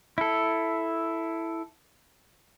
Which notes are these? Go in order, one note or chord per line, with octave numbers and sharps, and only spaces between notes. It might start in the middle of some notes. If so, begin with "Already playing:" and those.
E4 A4